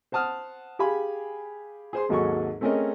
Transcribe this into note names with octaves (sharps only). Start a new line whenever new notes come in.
C5 F#5 A5 D#6 F6
G4 G#4 F5 G#5 B5
G#4 C5 C6
G#1 D#2 F#3 G#4 A4 C#6
A3 C4 C#4 G#4 A#4 D#5